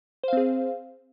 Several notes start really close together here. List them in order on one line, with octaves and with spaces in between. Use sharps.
C5 F5 C4 G#4